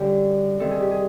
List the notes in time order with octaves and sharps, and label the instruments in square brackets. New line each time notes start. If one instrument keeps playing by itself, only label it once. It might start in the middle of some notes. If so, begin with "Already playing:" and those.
Already playing: [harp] F#2 D3 G3 G4
F2 C3 D#3 G3 C4 A4
G#4
G4
G#4